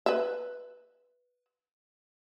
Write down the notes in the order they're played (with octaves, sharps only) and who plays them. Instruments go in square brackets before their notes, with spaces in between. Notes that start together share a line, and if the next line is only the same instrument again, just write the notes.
[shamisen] B4 E5